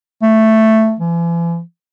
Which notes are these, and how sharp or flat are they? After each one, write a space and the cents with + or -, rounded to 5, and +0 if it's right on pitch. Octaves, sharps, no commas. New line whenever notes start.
A3 +5
E3 +45